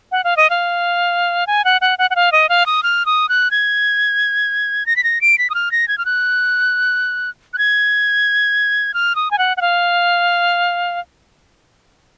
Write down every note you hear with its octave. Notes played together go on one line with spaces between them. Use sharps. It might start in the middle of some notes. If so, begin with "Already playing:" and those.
F#5
F5
D#5
F5
G#5
F#5
F#5
F#5
F#5
F5
D#5
F5
D#6
F6
D#6
F#6
G#6
A#6
B6
A#6
D7
B6
D#6
F6
A#6
G#6
F6
F#6
F#6
G#6
F6
D#6
G#5
F#5
F#5
F5